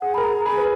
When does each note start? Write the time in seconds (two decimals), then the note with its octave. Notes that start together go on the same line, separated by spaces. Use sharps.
0.01 G#4 F#5
0.14 A#4 B5
0.23 G#4 A#5
0.45 G#4 B5
0.57 B4